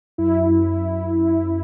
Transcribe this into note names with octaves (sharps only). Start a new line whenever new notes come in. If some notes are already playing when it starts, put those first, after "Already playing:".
F#2 E4
F#2